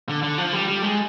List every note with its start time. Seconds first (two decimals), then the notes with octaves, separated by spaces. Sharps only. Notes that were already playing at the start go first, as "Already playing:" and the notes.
0.09 D3
0.23 D3
0.38 F3
0.53 G3
0.68 G3
0.82 G#3